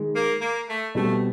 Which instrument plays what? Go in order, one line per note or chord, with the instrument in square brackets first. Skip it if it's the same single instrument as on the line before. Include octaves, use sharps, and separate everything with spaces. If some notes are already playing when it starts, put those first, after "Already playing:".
Already playing: [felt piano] D#3 G#3
[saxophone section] A#3
A#3
A3
[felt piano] B2 G3 C4 [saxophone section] A3